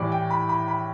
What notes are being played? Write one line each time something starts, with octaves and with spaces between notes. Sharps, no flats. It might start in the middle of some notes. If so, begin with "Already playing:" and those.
Already playing: A2 E3 G3 D5
G5
B5
B5
B5